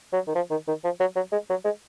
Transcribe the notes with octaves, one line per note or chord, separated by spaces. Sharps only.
F#3
D#3
F3
D#3
D#3
F3
F#3
F#3
G#3
F#3
G#3